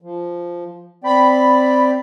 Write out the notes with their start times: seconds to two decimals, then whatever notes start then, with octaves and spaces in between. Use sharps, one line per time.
0.02 F3
1.04 C4 D5 G5 B5